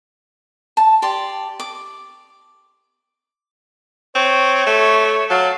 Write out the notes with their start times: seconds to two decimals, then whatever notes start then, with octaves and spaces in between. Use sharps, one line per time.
0.77 A5
1.02 G4 D5 C6
1.60 D6
4.15 C4 C#5
4.66 A3
5.30 F#3 F5 A5